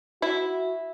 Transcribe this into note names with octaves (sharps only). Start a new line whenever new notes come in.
E4 F#4